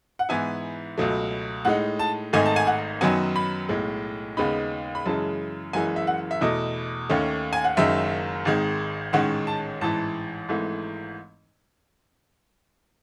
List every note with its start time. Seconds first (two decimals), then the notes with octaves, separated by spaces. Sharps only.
0.19 F#5
0.29 G#2 E3 B3 E4 G#5
0.98 C#2 B2 F#3 A3
1.65 A2 G#3 D#4 F#5
1.99 A5
2.33 G#1 G#2 D#3 A3 D#4 G#5
2.46 A5
2.56 G#5
2.67 F#5
3.01 F#2 D#3 F#3 B3 G#5
3.36 B5
3.69 B1 A2 G#3
4.37 D#2 C#3 G#3 B3 D#4 B5
4.95 B5
5.06 F#2 C#3 E3 G#3 A5
5.73 F#1 F#2 E3 G#3 G#5
5.96 E5
6.07 F#5
6.31 E5
6.41 E2 B2 A3 D#5
7.10 D#2 D#3 A3 C#4
7.53 G#5
7.64 F#5
7.77 F#1 F#2 D#3 G#3 E5
8.45 G#1 G#2 D#3 G#3
9.13 A1 G#2 D#3 G#3 C#4 F#5
9.47 A5
9.81 A1 G#2 E3 A5
10.49 G#1 G#2 E3 A3